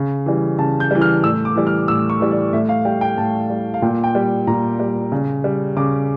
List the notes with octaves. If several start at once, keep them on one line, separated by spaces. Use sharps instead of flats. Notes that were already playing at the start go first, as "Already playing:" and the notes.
Already playing: C#3
E3 G3
C#3 A5
G6
E3 G3
F6
A2 E6
D6
E3 G3
F6
A2 E6
C#6
E3 G3
D5
A2 E5
F5
G3 G5
G5
A2 A5
G3
F5
A#2 G5
G5
G3
A#2 A#5
G3
C#3
G3
C#3 D6